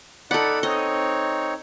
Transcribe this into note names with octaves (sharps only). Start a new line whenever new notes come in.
D#4 A4 D5 F#5 B5
C4 D#4 C#5 D#5